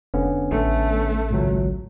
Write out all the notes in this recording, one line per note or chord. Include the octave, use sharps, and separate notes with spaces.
F1 D3 B3 C#4
A1 A3
G#1 C#2 F#3